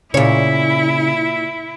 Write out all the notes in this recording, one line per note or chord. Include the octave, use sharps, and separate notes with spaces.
A#2 C#3 E4 C#5